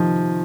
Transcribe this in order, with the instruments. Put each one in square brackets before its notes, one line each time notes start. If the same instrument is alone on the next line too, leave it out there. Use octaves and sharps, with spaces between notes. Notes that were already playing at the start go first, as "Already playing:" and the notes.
Already playing: [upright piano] C3 D#3 F3